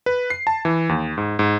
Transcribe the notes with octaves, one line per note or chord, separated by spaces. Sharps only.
B4
C7
A5
E3
D#2
G#2
G#2